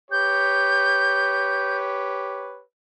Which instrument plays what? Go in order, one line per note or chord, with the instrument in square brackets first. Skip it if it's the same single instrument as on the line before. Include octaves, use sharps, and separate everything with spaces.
[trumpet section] G4 B4 C#5 [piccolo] G6